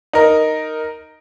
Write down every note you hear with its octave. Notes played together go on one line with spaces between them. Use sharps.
D#4 A#4